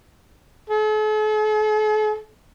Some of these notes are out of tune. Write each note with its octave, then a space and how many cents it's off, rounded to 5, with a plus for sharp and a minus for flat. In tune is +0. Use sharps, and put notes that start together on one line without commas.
A4 -45